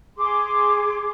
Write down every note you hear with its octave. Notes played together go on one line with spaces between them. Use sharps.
G#4 C6 D6